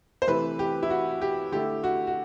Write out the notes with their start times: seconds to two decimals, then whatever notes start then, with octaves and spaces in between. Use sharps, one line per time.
0.22 C5
0.27 C3 E3 A3 B4
0.59 G4
0.83 E4
0.90 F#4
1.22 G4
1.52 D3 A3 E4 G4
1.84 F#4
2.07 F#4